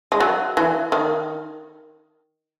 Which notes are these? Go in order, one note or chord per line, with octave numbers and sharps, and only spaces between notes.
G#3
F#3
E3
D#3